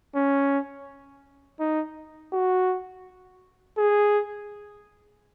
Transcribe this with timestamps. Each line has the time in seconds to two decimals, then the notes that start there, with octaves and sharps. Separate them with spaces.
0.16 C#4
1.60 D#4
2.33 F#4
3.78 G#4